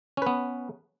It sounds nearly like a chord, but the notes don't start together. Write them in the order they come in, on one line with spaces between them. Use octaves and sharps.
C#4 B4 B3